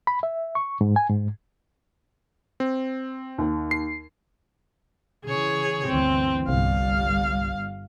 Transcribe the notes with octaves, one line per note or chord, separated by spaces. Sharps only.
B5
E5
C#6
G#2
G#5
G#2
C4
D#2
C7
C#3 E3 G#4 C#5
G1 D2 E3 C4
G1 C2 G2 G3 F5